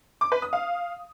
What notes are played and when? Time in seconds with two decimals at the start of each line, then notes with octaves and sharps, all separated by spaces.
0.21 D6
0.32 B4
0.42 D#6
0.53 F5